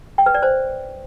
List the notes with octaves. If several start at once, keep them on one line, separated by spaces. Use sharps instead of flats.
G5
B4
D5
C5